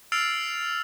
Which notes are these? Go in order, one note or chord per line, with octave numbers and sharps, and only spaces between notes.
E6 F6 A6 C7 D7 F7